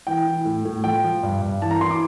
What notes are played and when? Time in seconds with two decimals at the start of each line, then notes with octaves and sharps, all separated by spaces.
0.07 E3 G5
0.27 E3
0.45 A2
0.65 A2
0.84 F3 G5
1.04 F3
1.23 G2
1.42 G2
1.62 E3 A5
1.71 A#5
1.81 E3 C6
1.91 D6